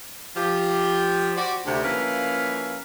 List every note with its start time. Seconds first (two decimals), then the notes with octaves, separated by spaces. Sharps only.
0.37 F3 G4
1.36 F#4 G4 C5 D5
1.66 D2 C3
1.83 F3 A#3 C#4 E4 B4 F5